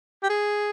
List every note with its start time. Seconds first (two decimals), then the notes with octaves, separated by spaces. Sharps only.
0.23 G4
0.30 G#4